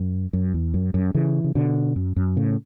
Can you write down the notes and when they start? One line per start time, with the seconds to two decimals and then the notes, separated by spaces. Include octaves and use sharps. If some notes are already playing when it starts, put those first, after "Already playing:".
Already playing: F#2
0.33 F#2
0.54 E2
0.74 F#2
0.94 F#2
1.14 C#3 E3
1.44 C#3
1.55 B2 D3
1.96 F#2
2.16 F#2
2.37 A2 C#3